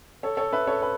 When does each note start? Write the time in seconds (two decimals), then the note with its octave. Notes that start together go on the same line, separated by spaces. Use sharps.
0.23 A4 C#5
0.37 A4 C#5
0.53 B4 E5
0.67 A4 C#5
0.82 B4